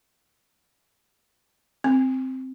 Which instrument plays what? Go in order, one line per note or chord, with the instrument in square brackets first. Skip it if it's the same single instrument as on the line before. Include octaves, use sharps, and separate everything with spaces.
[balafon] C4